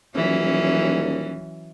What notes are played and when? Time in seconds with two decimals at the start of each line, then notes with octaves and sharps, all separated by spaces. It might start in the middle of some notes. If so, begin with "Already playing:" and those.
0.15 D#1 E3 F#3 C#4